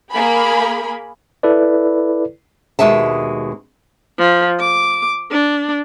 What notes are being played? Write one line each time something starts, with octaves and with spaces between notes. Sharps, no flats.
A#3 G#4 B5
E4 A4 B4 D5
D#2 B2 G#3 E5 A5
F3
D6
D4